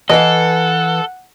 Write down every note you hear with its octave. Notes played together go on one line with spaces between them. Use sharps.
E3 A4 B4 D#5 F5 F#5